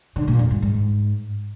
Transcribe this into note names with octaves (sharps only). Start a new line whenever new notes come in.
D3
A#2
F2
G#2
G#2